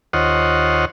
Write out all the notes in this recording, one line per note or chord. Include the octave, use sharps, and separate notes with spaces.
D#2 F4 C5 C#5 D#5 F#5